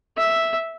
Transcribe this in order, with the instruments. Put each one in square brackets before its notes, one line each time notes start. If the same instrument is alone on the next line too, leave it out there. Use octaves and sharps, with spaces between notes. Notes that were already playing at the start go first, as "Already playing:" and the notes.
[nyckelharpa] E5